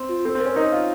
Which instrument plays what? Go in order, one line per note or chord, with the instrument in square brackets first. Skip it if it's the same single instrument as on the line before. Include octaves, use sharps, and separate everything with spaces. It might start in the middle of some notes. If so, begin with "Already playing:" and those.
Already playing: [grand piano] C4
[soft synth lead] F4
[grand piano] C4 [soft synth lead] A4
[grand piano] C4
[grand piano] C#4 [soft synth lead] A#4
[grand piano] D#4 [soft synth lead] D#5
[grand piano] F4